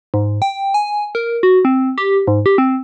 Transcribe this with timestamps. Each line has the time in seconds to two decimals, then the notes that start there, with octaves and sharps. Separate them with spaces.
0.14 G#2
0.42 G5
0.74 G#5
1.15 A#4
1.43 F#4
1.65 C4
1.98 G4
2.27 G#2
2.46 G4
2.58 C4